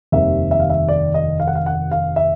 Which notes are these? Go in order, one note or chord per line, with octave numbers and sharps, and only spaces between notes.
F1 D#2 D#3 G3 C4 E5
E5
F5
E5
D5
D#5
F5
F#5
F5
F#5
F5
E5